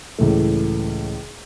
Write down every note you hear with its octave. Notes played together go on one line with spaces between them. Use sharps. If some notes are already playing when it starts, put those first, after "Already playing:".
C#2 A2 E3 A3